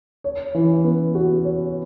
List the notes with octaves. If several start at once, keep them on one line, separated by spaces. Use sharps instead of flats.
C#5
E3
B3
F#4
C#5